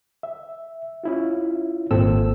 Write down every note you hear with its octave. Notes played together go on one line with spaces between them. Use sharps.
E5
C#4 E4 F4
G#1 A#2 C4 A4 E6